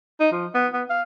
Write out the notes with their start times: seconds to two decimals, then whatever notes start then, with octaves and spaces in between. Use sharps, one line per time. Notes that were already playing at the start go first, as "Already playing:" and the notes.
0.20 D#4
0.32 F3
0.55 B3
0.73 B3
0.90 F5